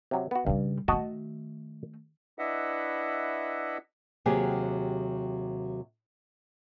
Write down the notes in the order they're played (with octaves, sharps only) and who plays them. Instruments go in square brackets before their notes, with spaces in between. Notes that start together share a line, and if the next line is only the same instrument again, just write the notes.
[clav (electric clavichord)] C3 F#3
B3 F#4
[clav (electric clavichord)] G2 [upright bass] C#3 G3
[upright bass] D#3 A3 [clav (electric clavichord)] F#4 D#5 A5
[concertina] D4 E4 B4 D#5 E5 F#5
[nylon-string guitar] D#2 C3 F#3 G4 G#4